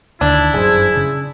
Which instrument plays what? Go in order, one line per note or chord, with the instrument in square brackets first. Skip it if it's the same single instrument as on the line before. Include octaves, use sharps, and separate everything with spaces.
[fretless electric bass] D2 D3 D#3 [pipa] D4 [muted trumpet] E4
[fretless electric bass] G1 F#2 [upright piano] G#4 C5
[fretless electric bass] C#3